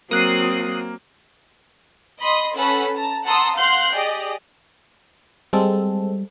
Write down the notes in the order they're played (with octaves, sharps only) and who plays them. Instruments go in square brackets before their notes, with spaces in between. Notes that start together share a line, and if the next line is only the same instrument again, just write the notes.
[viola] F#3 C4 [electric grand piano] A#3 [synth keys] D#6 F#6 C7
[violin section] D#5 B5 C6 D#6
C#4 A4 B4 F#5 B5
A5 A#5
F#5 A5 A#5 C6 D#6 E6
F5 F#5 C6 F#6 G6 C7
G4 G#4 D5 D#5
[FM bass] G3 [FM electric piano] G#3 C4 A4